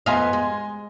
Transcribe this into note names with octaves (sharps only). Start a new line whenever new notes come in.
F2 B3 D#5 F5 G#5 C6
G#3